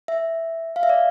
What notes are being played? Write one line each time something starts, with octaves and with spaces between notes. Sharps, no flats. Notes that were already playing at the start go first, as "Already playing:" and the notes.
E5
F5
E5
D5